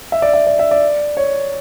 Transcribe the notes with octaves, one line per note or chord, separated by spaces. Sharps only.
E5
D5
E5
D5
E5
D5
C#5